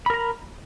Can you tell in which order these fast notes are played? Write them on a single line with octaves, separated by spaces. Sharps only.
B5 A#4 A#5